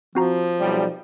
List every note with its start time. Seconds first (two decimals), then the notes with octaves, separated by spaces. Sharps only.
0.15 F3 C4 F#4 A#5
0.59 B1 G3